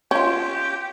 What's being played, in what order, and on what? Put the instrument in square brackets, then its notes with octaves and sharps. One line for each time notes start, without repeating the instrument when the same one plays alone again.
[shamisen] C#4 F4 [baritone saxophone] G4